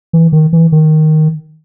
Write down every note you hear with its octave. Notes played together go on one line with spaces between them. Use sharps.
E3
D#3
E3
D#3